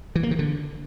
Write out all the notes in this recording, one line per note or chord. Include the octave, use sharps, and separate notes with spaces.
E3
A#3
D#3
D3